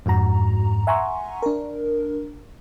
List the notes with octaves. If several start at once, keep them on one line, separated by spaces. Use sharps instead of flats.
F2 G#2 F#4 A#5
E5 F#5 G#5 A#5 C6 C#6
D4 A#4